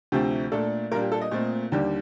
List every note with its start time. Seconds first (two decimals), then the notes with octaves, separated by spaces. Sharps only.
0.12 D2 C3 F3 A3 C4 G4
0.52 A#2 A3 D4 A4
0.91 A#2 G3 A#3 D4 A#4
1.02 G4
1.12 A4
1.21 D#5
1.31 A#2 A3 C4
1.72 D#2 D3 G3